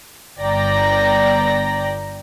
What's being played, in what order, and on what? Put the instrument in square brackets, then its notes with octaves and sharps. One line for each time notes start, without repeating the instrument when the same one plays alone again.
[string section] G1 D5 G5 A#5 A#6